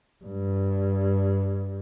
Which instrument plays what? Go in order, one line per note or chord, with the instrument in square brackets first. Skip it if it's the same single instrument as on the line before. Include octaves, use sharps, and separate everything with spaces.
[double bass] G2